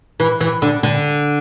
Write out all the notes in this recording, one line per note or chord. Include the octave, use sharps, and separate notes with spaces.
E3
E3
D3
D3